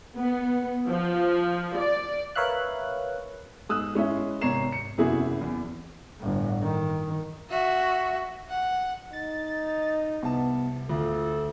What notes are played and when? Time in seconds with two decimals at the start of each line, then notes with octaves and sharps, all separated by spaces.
0.17 B3
0.89 F3
1.77 D5
2.35 A#4 B4 C#5 E5 F5 F#6
3.69 G#2 D#6 E6 F#6
3.95 G#3 C#4 E4 E5
4.41 G#1 C3 C#5 A#5 C7 E7
4.72 C#7
4.98 F#1 E2 C3 E4 F#4 G#4
5.41 E2
6.20 G1 A2
6.61 D#3
7.50 F#4 E5
8.50 F#5
9.13 D#4 A6
10.22 C2 B3 A5
10.89 D2 F4 A4